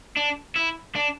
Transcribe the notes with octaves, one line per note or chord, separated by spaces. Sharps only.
D4
E4
D4